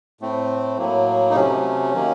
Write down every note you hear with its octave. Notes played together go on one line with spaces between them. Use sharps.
A2 A3 C4
A2 F#3 A#3
D#4
C3 F#3 A3 C#4
D#3 F#3 A#3